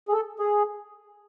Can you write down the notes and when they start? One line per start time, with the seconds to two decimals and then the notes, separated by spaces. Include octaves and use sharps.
0.09 G#4
0.13 A4
0.39 G#4